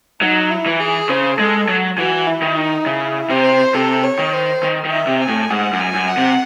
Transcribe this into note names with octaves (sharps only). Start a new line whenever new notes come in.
F#3 D#4
E4
E3
G#4
C#3 C5
G#3 A4
F#3
E3 F#4
E4
D#3
D#4
C#3 E4
C3 C5
C3 A4
C#5
D#3
C5
D#3
D#3
E5
C3
G#5
A2
G#2 F#5
F#2
G#5
F#2
F#5
C3